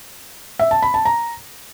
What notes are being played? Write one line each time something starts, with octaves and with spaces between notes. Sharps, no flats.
E5
A5
B5
A5
A#5